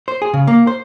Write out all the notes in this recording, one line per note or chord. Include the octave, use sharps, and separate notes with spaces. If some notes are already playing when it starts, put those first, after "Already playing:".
C5
G#4
C#3
A#3
C5